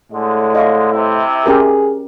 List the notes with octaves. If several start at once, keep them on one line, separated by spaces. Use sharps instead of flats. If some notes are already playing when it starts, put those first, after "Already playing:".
A2 D3 G#3
D#5 F5 C#6
C3 C4 E4
C#4 G4 G#4 A#4